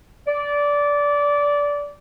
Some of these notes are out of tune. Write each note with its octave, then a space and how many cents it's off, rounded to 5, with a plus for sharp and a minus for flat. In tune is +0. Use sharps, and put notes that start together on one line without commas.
D5 -15